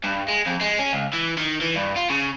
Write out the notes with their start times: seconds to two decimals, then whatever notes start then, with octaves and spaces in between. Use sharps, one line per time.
0.04 G2
0.28 G#3
0.47 F2
0.61 G#3
0.79 C#4
0.93 C#2
1.13 E3
1.38 D#3
1.61 E3
1.75 G2
1.96 F4
2.10 C#3